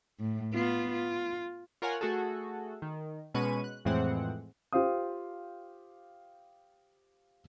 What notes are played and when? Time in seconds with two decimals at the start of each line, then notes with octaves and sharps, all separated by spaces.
0.20 A2
0.54 B3 F4
0.92 F4
1.82 F4 A#4 C#5 F#5 G#5
2.01 A3 F#4 G#4 A4
2.82 D#3
3.34 B2 G#3 C#4 B4 C#6 D#7
3.64 F#6
3.85 F2 A2 E3 G#3 C4 F#5
4.73 F4 G4 C5 F5 D#6